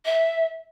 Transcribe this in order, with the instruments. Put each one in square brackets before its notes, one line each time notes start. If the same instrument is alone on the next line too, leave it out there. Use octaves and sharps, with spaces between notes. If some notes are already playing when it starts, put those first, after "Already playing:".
[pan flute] E5